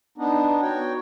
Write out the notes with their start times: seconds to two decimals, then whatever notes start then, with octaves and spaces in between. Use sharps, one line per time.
0.18 B3 D4 D#4
0.62 F#4 C#5 G5